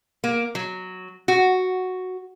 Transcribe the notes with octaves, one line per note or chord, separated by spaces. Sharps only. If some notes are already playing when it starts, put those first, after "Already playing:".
A#3
F#3
F#4